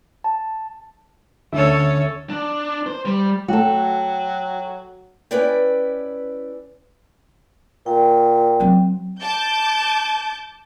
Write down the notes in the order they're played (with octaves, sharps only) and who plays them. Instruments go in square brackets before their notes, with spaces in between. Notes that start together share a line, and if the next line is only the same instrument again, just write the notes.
[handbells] A5
[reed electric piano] D2 D3 E5 [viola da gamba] C#4 A4 C#5
[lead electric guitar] D4
C5
G3
[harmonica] F#3 [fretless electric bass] A3 [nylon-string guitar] F#4 A4 [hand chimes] G5
[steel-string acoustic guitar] C#4 E4 B4 D5 G5
[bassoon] A#2 [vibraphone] G5
[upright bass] F#3 C4
[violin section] A5 D6 G6